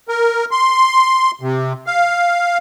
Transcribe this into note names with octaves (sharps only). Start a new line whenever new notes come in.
A#4
C6
C3
F5